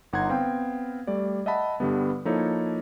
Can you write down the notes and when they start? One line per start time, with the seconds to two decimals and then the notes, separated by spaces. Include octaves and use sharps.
0.13 G1 D#4 F#5 A#5 C6 G#6
0.29 B3 C4 F5 G5
1.07 G3 A3 D5
1.46 D#5 E5 F#5 A5 B5
1.80 G2 D3 G3 B3
2.25 F3 A#3 D#4 E4 A4 C#5